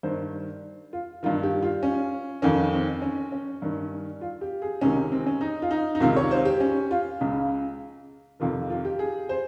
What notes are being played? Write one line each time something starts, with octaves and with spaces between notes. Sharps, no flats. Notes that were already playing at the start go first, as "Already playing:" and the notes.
G2 D#3 C5
F4
G2 D#3 F4
G4
F4
C#4
F2 D#3 C#4
C4
C#4
C#4
G2 D#3
F4
G4
G#4
C#2 C3 D#3 C#4
C4
C#4
D#4
F4
D#4
D#4
C#2 C3 D#3 F4
C#5
C5
G4
C#4
F4
C#2 C#3
F2 C3 D#3 F4
F4
G4
G#4
C5